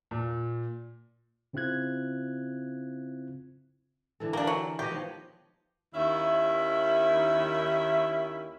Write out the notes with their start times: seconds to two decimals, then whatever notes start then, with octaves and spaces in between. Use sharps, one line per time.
0.11 A#2
1.53 C#3 C4 E4 F4 F#6 G#6
4.20 D3 E3 A4
4.33 A#3 D4 G4 A#4
4.47 F#3
4.79 F#4 G4 C#5 D#5
4.91 D#3 F3 B3
5.94 D#2 D#3 C#4 E4 E5